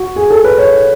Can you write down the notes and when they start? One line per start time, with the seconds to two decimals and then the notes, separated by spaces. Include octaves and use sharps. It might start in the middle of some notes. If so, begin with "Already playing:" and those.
Already playing: F#4
0.16 G#4
0.30 A4
0.44 B4
0.58 C#5